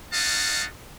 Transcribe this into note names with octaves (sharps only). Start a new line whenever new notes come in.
C#4 D#4 D#5 F5 F#5 A5